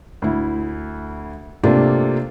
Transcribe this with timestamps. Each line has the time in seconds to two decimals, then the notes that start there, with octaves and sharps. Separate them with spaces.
0.22 D2 E4
1.64 C3 A3 A#3 D4 F4